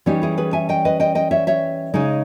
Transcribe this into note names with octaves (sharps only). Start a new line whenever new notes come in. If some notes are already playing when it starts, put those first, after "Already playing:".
E3 G3 C#4 D#4 G4
E4 G#4
G#4 B4
E5 G#5
D#5 G5
B4 D#5
D#5 G5
D#5 G5
C#5 E5
C#5 E5
C#3 G#3 D#4